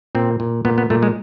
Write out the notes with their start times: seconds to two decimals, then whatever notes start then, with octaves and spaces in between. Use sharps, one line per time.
0.15 A#2 C4
0.40 A#2
0.65 A#2 B3
0.78 B3
0.90 A#2 A3
1.03 G#3